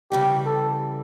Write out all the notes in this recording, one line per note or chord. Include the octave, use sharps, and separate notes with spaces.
C#3 E3 G3 G4
A4